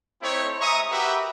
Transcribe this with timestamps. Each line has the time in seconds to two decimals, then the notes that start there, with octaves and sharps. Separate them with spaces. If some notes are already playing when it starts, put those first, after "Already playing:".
0.21 A3 C4 D#4 E4 C5 C#5
0.61 G#3 E5 A#5 C#6 D#6
0.90 F#4 G4 A#4 B4 E5